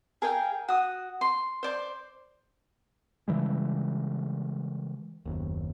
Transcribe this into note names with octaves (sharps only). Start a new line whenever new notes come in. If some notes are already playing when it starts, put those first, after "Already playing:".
G#4 A#4 F5 G5
F#4 D#6
C6
C5 D5 C6
C#3 E3 G3 G#3
F#1 D#2